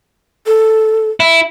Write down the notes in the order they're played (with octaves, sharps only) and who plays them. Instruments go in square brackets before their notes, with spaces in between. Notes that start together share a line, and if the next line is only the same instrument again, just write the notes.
[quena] A4
[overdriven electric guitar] E4